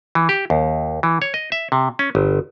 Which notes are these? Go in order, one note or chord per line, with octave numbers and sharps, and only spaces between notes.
E3
G4
D#2
E3
C#5
D#5
E5
C3
C#4
G1